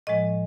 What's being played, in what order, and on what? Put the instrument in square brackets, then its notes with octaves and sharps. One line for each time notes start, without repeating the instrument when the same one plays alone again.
[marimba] A2 F3 G#3 D#5